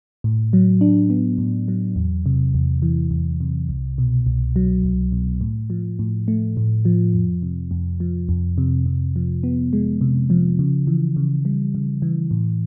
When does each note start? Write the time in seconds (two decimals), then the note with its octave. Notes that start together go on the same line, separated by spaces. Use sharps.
0.24 A2
0.53 F#3
0.81 D4
1.10 B3
1.38 A2
1.68 F#3
1.96 E2
2.26 C3
2.54 E2
2.82 E3
3.11 E2
3.40 C3
3.69 C2
3.98 B2
4.26 C2
4.56 F#3
4.84 C2
5.12 B2
5.41 A2
5.70 F3
5.99 A2
6.28 A3
6.57 A2
6.85 F3
7.14 F2
7.42 C3
7.71 F2
8.00 F3
8.29 F2
8.58 C3
8.86 C3
9.16 F3
9.43 B3
9.73 G#3
10.01 C3
10.30 F3
10.59 C#3
10.87 E3
11.17 C#3
11.45 G3
11.75 C#3
12.02 E3
12.31 A2